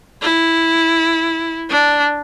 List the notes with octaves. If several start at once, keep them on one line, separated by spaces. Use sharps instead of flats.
E4
D4